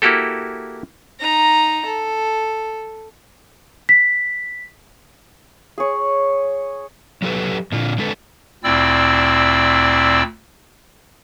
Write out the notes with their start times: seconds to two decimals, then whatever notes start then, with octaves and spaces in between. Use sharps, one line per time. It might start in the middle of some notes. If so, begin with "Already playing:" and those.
0.02 A#3 E4 F#4 G4 A4
1.20 D#4 A#5
1.86 A4
3.89 B6
5.78 G#4 C#5
7.22 F#3 G4 A4 B4
7.72 A#2 D3 F4
7.98 D3 G#3 A4 B4
8.64 D2 A#2 C4 E4 D5 E6